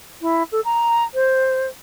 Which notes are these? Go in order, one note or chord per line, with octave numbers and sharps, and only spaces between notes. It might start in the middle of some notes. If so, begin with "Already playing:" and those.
E4
A4
A#5
C5